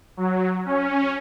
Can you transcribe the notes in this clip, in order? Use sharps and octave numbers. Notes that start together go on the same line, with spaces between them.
F#3
C#4